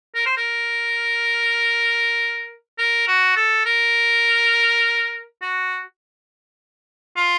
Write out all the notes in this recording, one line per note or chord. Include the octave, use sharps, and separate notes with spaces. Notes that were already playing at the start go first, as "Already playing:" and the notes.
A#4
C5
A#4
A#4
F#4
A4
A#4
F#4
F4